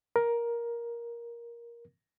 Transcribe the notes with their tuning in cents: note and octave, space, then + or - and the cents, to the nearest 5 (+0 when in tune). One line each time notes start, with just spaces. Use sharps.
A#4 +10